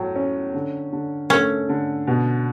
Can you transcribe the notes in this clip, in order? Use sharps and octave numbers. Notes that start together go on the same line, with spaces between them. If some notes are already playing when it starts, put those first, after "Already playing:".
Already playing: A2 F#3
C#4
D3
D3
A3 C#4
D3
B2